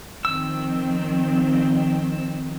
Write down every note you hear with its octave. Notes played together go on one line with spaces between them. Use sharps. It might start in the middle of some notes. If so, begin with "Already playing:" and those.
D#3 F3 C4 E6